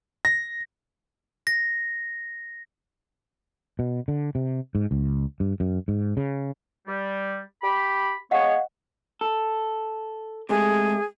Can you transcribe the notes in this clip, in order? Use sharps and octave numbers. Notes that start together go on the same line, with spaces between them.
A#6
A#6
B2
D3
C3
G#2
C#2
G2
F#2
G#2
C#3
G3
G4 B5
G#3 B3 C#5 D#5 F5 F#5
A4
C3 G#3 A3 G#4